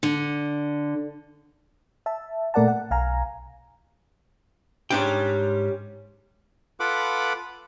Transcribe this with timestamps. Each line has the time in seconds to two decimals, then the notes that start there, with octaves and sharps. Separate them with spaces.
0.03 D3
2.06 E5 A5
2.54 A#2 A3 A#4 D5 F#5 A5
2.68 F#5
2.91 B1 F5 G#5 A#5
4.91 G#2 G3 C#4 D4 G5
6.80 F4 A4 B4 F#5 B5 D6